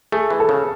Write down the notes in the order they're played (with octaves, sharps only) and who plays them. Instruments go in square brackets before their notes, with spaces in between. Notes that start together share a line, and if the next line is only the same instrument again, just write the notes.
[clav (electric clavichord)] A3 [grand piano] G#4
[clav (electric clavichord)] E3
[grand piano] A4
[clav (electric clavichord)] C#3